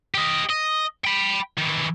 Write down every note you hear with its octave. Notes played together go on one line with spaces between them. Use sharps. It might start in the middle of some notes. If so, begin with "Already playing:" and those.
G4 D#5
D#5
G5 B5
D#3 E3